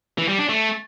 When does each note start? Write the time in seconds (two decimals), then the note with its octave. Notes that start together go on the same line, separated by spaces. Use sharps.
0.18 E3
0.28 G3
0.39 D4
0.49 A3